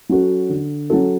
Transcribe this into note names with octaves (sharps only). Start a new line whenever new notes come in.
F#3 C#4 F#4 A4
D3
F#3 C#4 F#4 A4